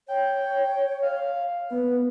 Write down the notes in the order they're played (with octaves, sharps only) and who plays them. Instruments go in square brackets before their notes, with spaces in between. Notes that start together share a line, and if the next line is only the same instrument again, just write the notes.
[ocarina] C#5 [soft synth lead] G5
[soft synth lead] F5
[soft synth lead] B3 [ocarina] B4